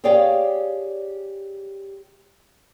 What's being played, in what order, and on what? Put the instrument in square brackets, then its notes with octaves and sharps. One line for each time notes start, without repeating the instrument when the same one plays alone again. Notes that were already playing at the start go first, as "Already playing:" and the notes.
[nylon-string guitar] G4 G#4 C#5 D5 F5 G5